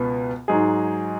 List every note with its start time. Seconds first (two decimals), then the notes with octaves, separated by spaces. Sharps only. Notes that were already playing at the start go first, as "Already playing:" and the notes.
Already playing: C#2 B2 B3
0.48 G#2 F#3 D#4 G#4